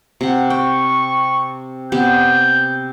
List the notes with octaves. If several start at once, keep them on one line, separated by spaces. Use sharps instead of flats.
C3 F#5
G5 C#6
C3 B3 G4 G6